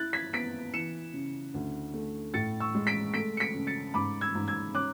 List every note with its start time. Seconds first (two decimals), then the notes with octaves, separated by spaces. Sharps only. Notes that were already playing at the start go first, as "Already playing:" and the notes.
Already playing: E4 F#6 A6
0.13 G#6 B6
0.33 B3 B6 D7
0.73 E3 C#7 E7
1.14 C#3
1.54 D2
1.94 A3
2.34 A2 A6 C#7
2.60 C#6 E6
2.75 G#3
2.87 B6 D7
3.14 A3 B6 D7
3.37 C#7
3.40 B6 D7
3.54 C#3
3.67 A6 C#7
3.94 G#2 B5 D6
4.21 E6 G#6
4.35 G#2
4.48 E6 G#6
4.74 C#4 D6 F#6